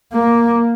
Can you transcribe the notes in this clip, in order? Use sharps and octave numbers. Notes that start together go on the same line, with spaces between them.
A#3